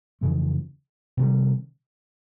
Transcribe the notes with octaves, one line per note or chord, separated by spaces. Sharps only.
F2 C#3 E3 A3
C3 D#3 G3